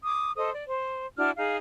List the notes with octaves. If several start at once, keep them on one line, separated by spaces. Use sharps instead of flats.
D6 D#6
A4 C5 D#5 D#6
D5
C5
D4 E4 F#4 F6
D#4 G#4 F5